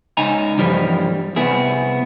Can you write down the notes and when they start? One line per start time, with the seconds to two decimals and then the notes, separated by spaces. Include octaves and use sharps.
0.17 C#2 D#4 G#5 A#5
0.58 G2 E3 F3 G3
1.36 C2 B3 E4 G#4